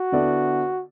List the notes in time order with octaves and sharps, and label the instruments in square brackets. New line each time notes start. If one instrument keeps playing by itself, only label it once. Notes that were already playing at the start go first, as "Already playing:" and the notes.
Already playing: [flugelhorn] F#4
[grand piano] D3 B3 E4 A4 D5